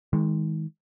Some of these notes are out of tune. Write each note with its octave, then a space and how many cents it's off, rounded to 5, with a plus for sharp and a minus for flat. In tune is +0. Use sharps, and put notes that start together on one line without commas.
D#3 +30 G#3 +0